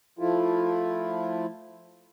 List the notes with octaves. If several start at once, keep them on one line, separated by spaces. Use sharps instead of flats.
F3 A3 E4 F4